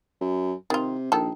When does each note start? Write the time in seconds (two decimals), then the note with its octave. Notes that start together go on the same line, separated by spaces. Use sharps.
0.21 F#2
0.70 C3 D#3 F4
1.12 A#1 D#3 A4